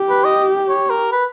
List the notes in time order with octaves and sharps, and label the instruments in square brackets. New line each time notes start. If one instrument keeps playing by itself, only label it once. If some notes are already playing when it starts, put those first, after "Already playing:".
Already playing: [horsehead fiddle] G4
[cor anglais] B4
D#5
C#5
A#4
B4